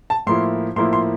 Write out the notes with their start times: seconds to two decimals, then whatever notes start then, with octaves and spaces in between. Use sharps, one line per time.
0.10 A5
0.27 A2 F3 A#3 E4 C6
0.76 A2 F3 A#3 E4 C6
0.93 C6